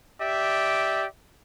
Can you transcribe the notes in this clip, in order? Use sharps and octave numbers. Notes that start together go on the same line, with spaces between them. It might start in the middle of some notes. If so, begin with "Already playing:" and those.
G4 D5 E5